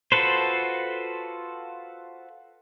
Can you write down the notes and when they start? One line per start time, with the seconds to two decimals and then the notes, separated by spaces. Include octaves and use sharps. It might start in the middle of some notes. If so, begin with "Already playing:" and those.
0.12 F4 F#4 A4 B4 C5